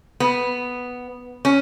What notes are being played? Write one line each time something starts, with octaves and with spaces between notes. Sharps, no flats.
B3
C#4